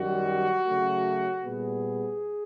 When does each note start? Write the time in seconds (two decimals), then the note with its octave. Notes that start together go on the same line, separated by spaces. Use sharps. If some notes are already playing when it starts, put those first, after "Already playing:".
Already playing: F#2 D#3 G3 F#4
0.66 C#3 F#3 A3
1.43 A#2 G3 B3 G#4